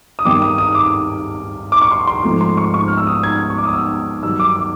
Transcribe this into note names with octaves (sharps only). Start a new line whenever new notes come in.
D#6
G2 D#3 G3 C4 D6
D#6
D#6
D6
D6
C#6
C6
C6
G#2 F3 A3 C4
C6
C#6
C#6
F6
E6
D#6
G#6
C#6
D6
D#6
E6
G2 D#3 F#3 E6
D6
D6